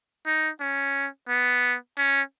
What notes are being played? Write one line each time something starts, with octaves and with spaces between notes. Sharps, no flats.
D#4
C#4
B3
C#4